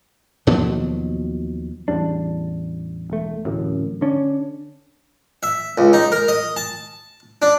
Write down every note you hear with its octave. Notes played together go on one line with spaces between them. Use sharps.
D#2 B2 F3 F#3
A1 E2 G3 D4
E1 A3
D1 A1 F#2
D3 C#4 D4
E5
C#2
D#4
A#4
D#5
A5
D4